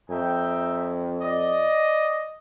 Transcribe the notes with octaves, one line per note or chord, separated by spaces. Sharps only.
F2 D#4 E5 G5
D5 D#5